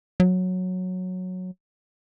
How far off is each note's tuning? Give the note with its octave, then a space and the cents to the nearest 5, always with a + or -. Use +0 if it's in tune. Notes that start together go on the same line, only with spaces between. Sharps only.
F#3 -10